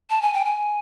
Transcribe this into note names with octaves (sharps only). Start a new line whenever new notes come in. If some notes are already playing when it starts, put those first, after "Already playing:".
A5
G#5
G5
G#5